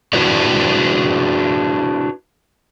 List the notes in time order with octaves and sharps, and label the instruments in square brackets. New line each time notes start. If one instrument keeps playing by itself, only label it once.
[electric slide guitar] D4 E4 F#4 B4 C#5 D5